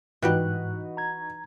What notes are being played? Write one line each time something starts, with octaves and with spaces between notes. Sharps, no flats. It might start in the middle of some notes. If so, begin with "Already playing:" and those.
G#2 E3 G3 D#4 F#4 G4 B4 F#6
A#5 G#6